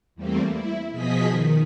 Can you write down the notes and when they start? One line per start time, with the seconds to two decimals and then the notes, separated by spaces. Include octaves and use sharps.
0.15 E2 G3 A3 A#3 C4
0.46 E4
0.91 B2 F3 G#4 D#5 B6
1.27 D#3